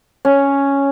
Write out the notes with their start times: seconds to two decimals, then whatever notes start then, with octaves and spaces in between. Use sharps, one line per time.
0.25 C#4